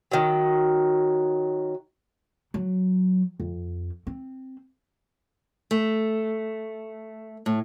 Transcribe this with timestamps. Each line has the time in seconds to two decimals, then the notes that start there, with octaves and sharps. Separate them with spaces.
0.12 D#3 F#3
2.54 F#3
3.40 F2
4.07 C4
5.71 A3
7.46 A2